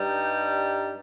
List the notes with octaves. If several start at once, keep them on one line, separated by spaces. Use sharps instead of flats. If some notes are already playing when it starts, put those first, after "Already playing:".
Already playing: G2 G3 D#4